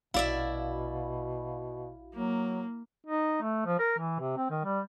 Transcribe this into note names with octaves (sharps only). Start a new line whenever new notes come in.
A#1 B2 E4 F#4 D5 E5 F5
F#3 A#3
D#4
A3
F3
A#4
E3
C3
C4
D#3
G3